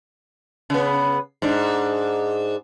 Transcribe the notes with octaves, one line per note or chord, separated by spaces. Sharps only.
C#3 B3
G#2 D4